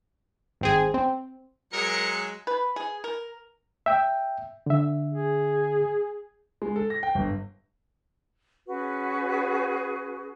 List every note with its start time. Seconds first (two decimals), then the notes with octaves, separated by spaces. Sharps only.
0.61 G#1 C4 G#4
0.94 C4
1.73 F#3 G#3 A#4 C#7
2.47 B4
2.76 G#4
3.04 A#4
3.86 E5 G5
4.66 D3 E5
5.13 G#4
6.62 G#3
6.76 A4
6.90 A#6
7.03 G5
7.15 G1
8.68 C#4 F#4 G#4 B4